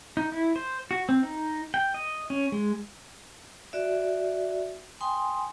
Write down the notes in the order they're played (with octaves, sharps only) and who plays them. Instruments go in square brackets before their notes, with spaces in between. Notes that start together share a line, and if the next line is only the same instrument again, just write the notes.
[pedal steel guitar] D#4
E4
C5
F#4
C4
D#4
G5
D#5
C#4
G#3
[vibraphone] F#4 D5 E5
G5 G#5 C6 D#6